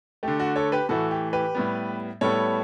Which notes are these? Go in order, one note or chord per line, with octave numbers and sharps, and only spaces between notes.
D3 A3 G4
F#4
A4 C#5
G4 B4
A2 E3 A3 F#4 A4
G4
G4 B4
A2 G3 B3
A2 G3 B3 A4 C#5